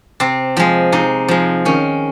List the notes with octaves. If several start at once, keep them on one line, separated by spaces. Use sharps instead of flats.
C3 C4
F3 G#3
C3 D#4
F3 G#3
D#3 C#4